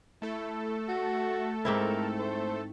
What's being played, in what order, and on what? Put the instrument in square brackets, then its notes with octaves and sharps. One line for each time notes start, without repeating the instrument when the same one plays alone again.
[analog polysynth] A3 A4 [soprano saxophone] E4
[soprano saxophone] F#4
[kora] G#2 C4 E4 [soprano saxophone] A#4
[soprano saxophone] C5